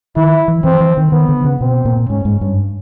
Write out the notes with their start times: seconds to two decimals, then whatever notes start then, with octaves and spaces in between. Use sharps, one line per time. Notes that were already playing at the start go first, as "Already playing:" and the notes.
0.16 D#3 E4
0.48 E3
0.64 E3 C4
0.80 E3
0.97 D#3
1.12 D#3 B3
1.29 D3
1.44 C#3
1.61 B2 C4
1.85 A#2
2.09 G#2 C#4
2.25 G#2
2.41 G2